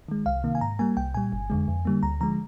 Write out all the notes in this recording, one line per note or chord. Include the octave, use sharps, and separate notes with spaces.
D#3 G#3
C2 F5
C3 D#3 A#3
G#5
G#2 A#5
G3 A#3 G#5
C2 G5
A#2 G3 G#5
G1
F2 D3 G#3
F2
D3 G3 A#3
D2 A#5
D3 F3 G#3 A#5